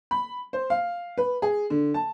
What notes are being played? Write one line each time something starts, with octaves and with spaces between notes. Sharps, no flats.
B5
C5
F5
B4
G#4
D3
A5